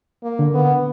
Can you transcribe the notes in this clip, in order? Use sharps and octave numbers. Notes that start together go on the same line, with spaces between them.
A#3
D3
B3